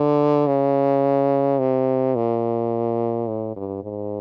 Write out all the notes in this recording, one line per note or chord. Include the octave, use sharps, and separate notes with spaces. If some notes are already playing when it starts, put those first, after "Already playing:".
Already playing: D3
C#3
C3
A#2
A2
G2
G#2